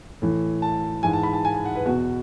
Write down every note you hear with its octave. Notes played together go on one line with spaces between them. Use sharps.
A2 E3
A5
G#2 E3 G#5
A5
B5
A5
G#5
G#5
F#5
B4
E2 B2 F#4